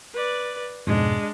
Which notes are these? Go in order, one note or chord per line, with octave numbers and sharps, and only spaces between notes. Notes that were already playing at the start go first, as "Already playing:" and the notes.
B4 D5
F2 G#2 B2 G#3 D4